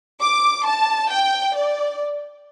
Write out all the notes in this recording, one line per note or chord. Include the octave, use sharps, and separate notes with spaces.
D6
A5
G5
D5